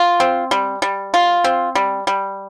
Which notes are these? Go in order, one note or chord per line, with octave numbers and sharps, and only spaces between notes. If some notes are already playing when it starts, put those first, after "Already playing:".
Already playing: F4
C4
G3
G3
F4
C4
G3
G3